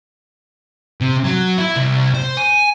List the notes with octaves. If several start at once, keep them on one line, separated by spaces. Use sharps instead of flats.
C3
F#3
E4
C2
C5
G#5